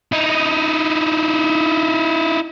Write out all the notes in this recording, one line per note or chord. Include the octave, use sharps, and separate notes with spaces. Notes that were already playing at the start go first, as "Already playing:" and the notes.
D#4 E4